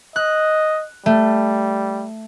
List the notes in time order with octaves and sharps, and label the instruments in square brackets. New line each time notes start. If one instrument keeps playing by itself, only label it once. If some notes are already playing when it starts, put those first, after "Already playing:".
[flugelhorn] D#5 [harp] F#6
[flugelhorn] G3 [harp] A3